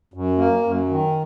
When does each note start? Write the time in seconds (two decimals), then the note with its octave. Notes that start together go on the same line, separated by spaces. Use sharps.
0.14 F#2
0.38 A#3
0.63 F#2
0.89 D#3